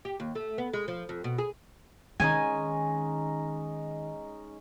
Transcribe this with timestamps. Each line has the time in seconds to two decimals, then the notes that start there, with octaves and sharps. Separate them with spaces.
0.05 G4
0.20 D#2
0.35 A3
0.58 B3
0.74 G#3
0.88 F3
1.09 F2
1.24 B2
1.38 G#4
2.20 D#3 G#3 C#4 D#4 G#5